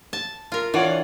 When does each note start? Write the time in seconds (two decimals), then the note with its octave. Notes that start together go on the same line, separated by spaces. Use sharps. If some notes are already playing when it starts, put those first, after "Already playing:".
0.13 A5
0.52 F4 A#4
0.74 E3 D4 F4 C#5 D5 F#5